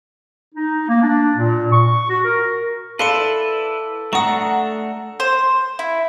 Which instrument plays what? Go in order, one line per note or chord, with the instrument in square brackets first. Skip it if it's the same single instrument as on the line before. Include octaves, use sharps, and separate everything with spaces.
[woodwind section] D#4
A#3
D4
A#2
C#6
F#4
A#4
[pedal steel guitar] E4 B4 [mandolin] A4 [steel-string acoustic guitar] D5 [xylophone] F5 C6 C#7
[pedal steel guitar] A3 D4 F#4 [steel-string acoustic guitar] F#5 A#5 [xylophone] C#6 D#6
[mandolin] C5
E4